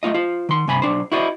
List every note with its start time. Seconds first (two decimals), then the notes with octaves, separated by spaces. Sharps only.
0.03 A3 C4 F4 D#5
0.14 F4 C5
0.49 D#3 C6
0.67 G2 C3 G#5 B5
0.82 B1 C#3 D4 C5
1.12 E4 F#4 C5 D5 D#5